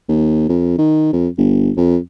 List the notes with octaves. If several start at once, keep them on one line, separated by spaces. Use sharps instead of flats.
D#2
F2
D#3
F2
G1
F2